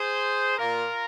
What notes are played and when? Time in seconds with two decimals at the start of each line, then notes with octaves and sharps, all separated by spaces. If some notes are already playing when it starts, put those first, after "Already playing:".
Already playing: G#4 C5
0.58 A#2 A#3 F4 A#4